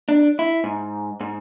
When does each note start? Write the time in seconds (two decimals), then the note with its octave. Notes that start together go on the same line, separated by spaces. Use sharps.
0.09 D4
0.39 E4
0.64 G#2
1.20 G#2